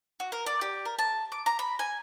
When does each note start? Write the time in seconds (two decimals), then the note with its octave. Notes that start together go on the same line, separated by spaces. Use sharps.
0.20 F#4
0.32 A#4
0.46 D5
0.61 G4
0.85 A#4
0.99 A5
1.32 D6
1.46 A#5
1.59 B5
1.79 G#5